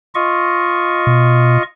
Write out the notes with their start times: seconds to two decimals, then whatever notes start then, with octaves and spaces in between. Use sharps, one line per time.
0.15 F4 D#5 C#6
1.07 B2